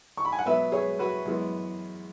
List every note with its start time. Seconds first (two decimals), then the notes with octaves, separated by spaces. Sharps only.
0.17 C#6
0.25 B5
0.32 G#5
0.39 F#5
0.46 B2 F#3 B3 B4 E5
0.72 G#4 C#5
0.99 F#4 B4
1.26 F#2 E3 G#3 B3